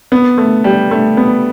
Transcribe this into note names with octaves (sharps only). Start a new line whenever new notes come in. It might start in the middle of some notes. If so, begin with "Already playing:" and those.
B3
A3
G3
A3
B3